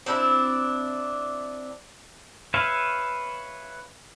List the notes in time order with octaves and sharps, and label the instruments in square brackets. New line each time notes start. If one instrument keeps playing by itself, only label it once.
[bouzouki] C4 D4 E4
[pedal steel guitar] B4 C#5 E5 F5